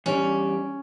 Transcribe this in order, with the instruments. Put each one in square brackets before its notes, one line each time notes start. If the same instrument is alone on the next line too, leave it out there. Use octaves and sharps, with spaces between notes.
[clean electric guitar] E2 G3 D4 [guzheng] C#4